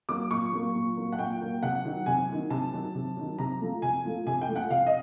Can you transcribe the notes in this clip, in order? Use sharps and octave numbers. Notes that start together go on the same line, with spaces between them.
F#3 A#3 D6
A#2 C#6
F#3 A#3
A#2
F#3 A#3
F#5
A#2 G5
F#3 A#3
C3 F#5
D#3 F#3
C3 G#5
D#3 F#3
C3 A5
D#3 F#3
C3
D#3 F#3
C3 A#5
F3 A3
C3 G#5
F3 A3
C3 G#5
G5
F3 A3
F#5
C3 F5
D#5